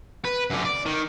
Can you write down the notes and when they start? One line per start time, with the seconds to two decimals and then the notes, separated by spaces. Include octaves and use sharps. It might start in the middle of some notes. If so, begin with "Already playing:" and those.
0.25 B4
0.50 F#2 D3
0.65 D5
0.86 D#3